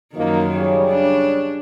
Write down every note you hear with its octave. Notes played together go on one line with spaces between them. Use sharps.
F#2 D#3 F3 A#3 D#4
C#3 G3 C#5
D4